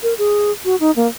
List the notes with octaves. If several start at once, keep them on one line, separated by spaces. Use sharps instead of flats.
A#4
G#4
F#4
D#4
A#3